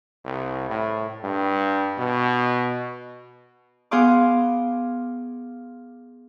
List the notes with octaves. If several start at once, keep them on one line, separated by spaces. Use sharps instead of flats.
C2
A2
G2
B2
B3 G#4 F5 C6 D6